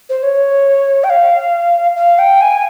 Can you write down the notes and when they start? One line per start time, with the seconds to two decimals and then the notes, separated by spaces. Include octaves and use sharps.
0.09 C5
0.22 C#5
1.03 G5
1.09 F5
1.96 F5
2.18 G5
2.40 G#5